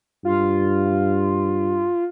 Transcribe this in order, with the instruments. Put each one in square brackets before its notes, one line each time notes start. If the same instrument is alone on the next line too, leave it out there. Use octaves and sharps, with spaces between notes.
[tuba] G2 [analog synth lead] F4